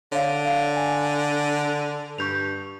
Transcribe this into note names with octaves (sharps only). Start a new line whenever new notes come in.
D3 C#5 F5
F5
G#5
G2 C#6 G6 F7